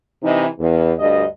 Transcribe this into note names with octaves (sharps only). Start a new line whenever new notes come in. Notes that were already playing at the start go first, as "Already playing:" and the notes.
C3 E3 D#4
E2
D2 G2 D#5